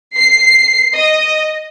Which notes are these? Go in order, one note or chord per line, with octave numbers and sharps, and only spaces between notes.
C7
D#5